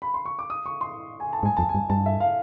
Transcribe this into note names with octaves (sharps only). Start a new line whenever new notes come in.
B5
C6
C#6
D6
D#6
C#6
C6
G#5
A5
G#2 G#5
F2 A5
G#5
G2
G2 A5
E5
F5